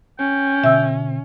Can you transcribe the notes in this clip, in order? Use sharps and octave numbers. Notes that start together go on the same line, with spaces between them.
C#4 G5
B2 D3 E5 E6